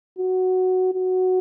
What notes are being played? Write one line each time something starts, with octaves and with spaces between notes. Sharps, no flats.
F#4
F#4